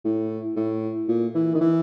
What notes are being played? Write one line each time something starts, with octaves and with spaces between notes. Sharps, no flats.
A2
A2
A#2
E3
D#3
E3